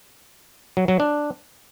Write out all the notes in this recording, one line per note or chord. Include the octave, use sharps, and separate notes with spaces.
F#3
F#3
D4